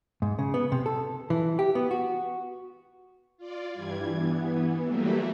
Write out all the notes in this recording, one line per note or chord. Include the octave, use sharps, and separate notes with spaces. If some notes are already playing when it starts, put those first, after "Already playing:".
G#2
C#3
B3
C3
A4
E3
G4
B3
F#4
F4 D5
G2 E3 G3 G#6
E3 B3
E3 F#3 G3 A3 A#3 E4